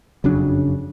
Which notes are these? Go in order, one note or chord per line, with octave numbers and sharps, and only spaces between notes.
F#1 F2 C#3 F#3 D4